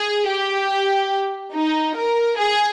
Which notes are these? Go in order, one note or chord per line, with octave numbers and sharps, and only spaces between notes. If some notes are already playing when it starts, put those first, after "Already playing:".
Already playing: G#4
G4
D#4
A#4
G#4